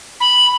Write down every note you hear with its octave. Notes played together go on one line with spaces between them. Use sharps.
B5